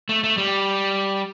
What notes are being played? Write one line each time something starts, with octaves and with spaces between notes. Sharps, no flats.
A3
A3
G3